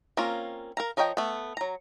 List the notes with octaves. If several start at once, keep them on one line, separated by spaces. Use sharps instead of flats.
A#3 C4 C#4 F4 A#4
A#4 F5 A#5
F3 A#4 C#5 D#5 G5
A3 B3
F#3 A#5